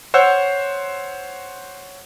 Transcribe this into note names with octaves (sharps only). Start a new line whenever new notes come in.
C5 C#5 F#5 E6 G6